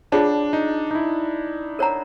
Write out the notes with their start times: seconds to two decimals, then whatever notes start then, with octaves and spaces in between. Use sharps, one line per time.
0.12 D4 F4 G#4 C#5 F#5 A5
0.53 D#4
0.91 D#4
0.95 E4
1.79 A#4 C#5 F#5 A#5